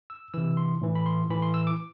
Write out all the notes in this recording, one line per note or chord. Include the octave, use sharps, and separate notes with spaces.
E6
C3 E3 E6
C6
A2 E3
B5
C6
A2 E3 B5
C6
E6
D6